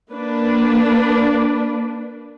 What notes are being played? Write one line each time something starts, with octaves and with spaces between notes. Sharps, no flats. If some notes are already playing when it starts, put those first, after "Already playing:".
A#3 D4 B4